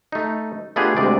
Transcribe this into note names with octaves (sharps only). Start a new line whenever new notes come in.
A3 D#4
A3 B3 D4 F4 G4 G#4
D2 C3 G#3 D5